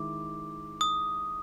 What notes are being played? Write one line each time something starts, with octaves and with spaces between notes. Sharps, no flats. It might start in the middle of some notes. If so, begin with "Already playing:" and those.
Already playing: D#3 G#3 E4 D6
D#6